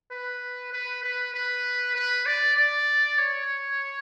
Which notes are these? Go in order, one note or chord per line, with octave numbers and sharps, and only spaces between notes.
B4
B4
B4
B4
B4
D5
D5
C#5